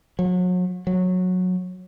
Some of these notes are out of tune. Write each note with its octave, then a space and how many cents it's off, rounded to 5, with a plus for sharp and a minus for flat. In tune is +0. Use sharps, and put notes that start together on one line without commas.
F#3 -35
F#3 -15